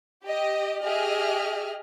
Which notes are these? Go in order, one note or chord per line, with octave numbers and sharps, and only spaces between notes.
G4 D#5
G4 G#4 D#5 E5 F6